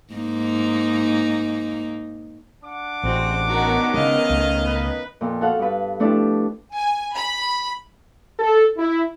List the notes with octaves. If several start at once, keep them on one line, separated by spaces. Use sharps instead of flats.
G#2 A#3 D#4
D4 F#5 D6
A1 G#3 C4 F#4
D#3 B3 C#4 F#4 A#5
C#3 G#3 D#5 F5
C#2 A3
D#4 B4
F2 A#2
F#4 A4 F5 F#5
G2 B4
F3 A3 D4 E4 G4
G#5
B5
A4
E4